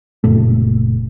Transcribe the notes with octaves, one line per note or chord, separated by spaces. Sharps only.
F#1 A#2 A3